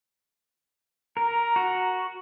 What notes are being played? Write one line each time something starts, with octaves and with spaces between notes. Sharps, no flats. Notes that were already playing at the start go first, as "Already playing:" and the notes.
A#4 A#5
F#4